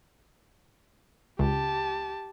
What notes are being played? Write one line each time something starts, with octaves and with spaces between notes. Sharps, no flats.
C#2 G4 A5